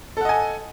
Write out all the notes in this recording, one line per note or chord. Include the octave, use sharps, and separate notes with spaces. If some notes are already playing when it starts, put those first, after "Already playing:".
A4 D#5 F#5 G#5